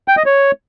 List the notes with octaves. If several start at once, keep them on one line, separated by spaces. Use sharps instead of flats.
G5
D#5
C#5